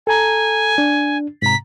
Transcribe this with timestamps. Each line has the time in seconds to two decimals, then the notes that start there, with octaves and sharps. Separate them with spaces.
0.07 A4 G#5 A#5
0.78 D4
1.42 G#2 C3 A#5 B6